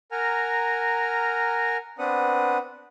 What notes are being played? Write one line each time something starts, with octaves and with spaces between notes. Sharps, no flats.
A#4 F#5 G#5 A#5 F6
B3 C4 D4 B4 F#5 D#6